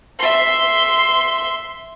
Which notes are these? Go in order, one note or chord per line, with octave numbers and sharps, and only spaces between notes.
E5 C6